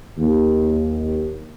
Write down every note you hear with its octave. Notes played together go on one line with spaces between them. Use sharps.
D#2